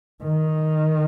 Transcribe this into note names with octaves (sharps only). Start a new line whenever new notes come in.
D#3